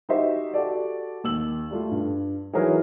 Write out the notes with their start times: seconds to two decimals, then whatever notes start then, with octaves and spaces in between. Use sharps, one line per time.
0.09 D#4 F#4 G4 C5 D#5 E5
0.54 F#4 G4 A4 D5
1.24 D#2 E6 F#7
1.71 G3 A3 F4
1.91 G2
2.53 E3 F#3 D#4 G#4 A#4 C#5